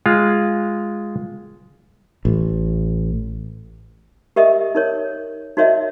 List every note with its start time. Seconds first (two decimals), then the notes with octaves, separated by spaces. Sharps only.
0.06 G#3 F4
2.25 A1
4.36 G4 A#4 D#5 E5 D#6
4.75 D#4 A#4 C#5
5.57 D#4 F#4 A#4 C#5 D#5 E5